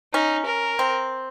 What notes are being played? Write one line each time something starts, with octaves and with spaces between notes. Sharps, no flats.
C#4 D#4
A#4
C4